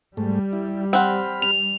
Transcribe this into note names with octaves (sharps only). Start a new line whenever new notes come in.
G#2 G3 A3
E4
C4 G4 F#5 B5 F6
F7